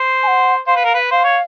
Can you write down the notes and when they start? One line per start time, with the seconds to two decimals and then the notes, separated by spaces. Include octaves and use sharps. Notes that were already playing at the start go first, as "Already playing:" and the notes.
Already playing: C5
0.23 G#5
0.27 F#5
0.67 C5 F5
0.76 B4
0.84 A#4
0.94 B4
1.11 C5 F5
1.24 C#5